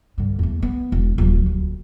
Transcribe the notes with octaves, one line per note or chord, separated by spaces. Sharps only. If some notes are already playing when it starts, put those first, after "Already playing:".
G2 D3
E2 A3
B3
E1
D#1 F#3
D2